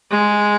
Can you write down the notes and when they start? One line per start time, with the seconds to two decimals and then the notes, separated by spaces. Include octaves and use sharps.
0.11 G#3